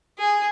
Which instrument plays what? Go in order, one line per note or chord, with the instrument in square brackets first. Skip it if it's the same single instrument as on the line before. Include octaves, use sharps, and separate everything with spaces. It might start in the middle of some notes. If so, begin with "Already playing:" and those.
[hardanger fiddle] G#4